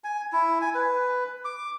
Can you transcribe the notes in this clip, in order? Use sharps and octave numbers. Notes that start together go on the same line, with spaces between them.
G#5
E4
G#5
B4
D6